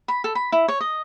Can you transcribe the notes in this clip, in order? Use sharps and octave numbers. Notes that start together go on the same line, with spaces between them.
B5
A4
B5
E4
C#5
D#5